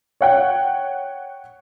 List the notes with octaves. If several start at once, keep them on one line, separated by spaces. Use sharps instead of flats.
C#5 F#5 G5